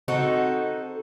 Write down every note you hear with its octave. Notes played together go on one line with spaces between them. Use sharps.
C4 D#4 F#4 A4